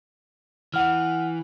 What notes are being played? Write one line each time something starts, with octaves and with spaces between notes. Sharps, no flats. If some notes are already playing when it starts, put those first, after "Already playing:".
E3 F#5 F6